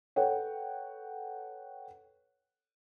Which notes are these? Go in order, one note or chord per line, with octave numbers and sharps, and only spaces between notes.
A4 B4 C#5 F#5 G5